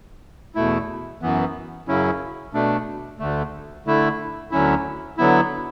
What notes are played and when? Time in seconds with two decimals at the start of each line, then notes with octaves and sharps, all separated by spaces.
0.55 E2 B2 A3 E4
1.22 F#2 E3 B3
1.88 F#2 C#3 F#3 C#4 E4
2.53 B2 A3 D4
3.19 D2 D3 A3
3.86 D3 A3 E4
4.51 D2 D3 F#3 C#4 E4
5.18 D3 F#3 B3 E4